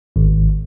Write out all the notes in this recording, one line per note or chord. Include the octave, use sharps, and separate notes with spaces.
G#1